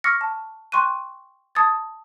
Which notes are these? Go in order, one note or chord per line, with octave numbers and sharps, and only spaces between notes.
C#6 D6 E6 F6 A#6 C#7
A5
G5 C6 C#6 F#6 D#7
A5 D#6 G#6 A6